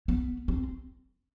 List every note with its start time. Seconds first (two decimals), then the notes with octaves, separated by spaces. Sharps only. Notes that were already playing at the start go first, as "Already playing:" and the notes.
0.08 B3
0.48 C4